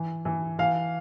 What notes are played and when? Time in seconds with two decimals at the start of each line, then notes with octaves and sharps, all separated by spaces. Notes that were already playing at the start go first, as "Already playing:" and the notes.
Already playing: E3
0.25 E3
0.59 E3 F5